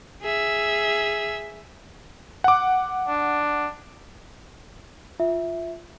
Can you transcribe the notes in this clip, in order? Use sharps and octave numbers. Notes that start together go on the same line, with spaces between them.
G#4 E5
F#5 D6
D4
F4 E5